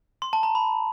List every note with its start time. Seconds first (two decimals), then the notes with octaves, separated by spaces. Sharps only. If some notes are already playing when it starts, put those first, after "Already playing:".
0.22 C6
0.33 A5
0.43 A#5
0.55 B5